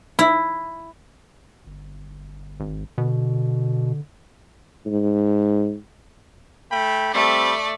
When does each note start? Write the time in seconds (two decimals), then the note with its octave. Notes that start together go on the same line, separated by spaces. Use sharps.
0.19 E4
1.66 G1
2.60 G#1
2.98 B2 D3
4.86 G#2
6.69 A3 G5 B5
7.13 G3 A3 C4 D5 B5